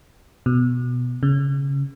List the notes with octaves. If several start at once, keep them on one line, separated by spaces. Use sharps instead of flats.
B2
C#3